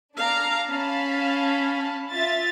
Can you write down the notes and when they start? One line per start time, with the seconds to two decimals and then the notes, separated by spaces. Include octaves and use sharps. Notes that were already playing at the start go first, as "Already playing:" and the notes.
0.17 D4 F5 A#5
0.69 C#4 F5 A5 B5
2.12 F4 E5 A6